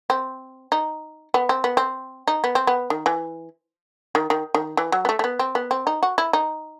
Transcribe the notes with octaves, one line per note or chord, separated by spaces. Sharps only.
C4
D#4
B3
C4
B3
C4
D#4
B3
C4
B3
D#3
E3
D#3
D#3
D#3
E3
F#3
B3
A3
A3
B3
C4
B3
C4
D#4
F#4
E4
D#4